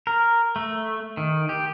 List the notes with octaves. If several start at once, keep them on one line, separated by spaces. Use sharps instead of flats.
A#4
A3
D#3
G4